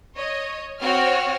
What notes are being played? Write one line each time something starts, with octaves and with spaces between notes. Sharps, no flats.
C#5 D#5
C4 F#4 C#5 F6